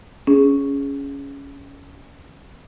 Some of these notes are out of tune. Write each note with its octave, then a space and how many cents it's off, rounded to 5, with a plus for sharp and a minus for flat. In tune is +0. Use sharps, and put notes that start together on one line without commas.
C#4 +10 G#4 +0